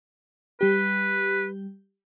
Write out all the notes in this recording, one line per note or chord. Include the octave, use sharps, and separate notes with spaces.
G3 G4 B4